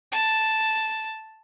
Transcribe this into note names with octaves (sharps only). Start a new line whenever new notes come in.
A5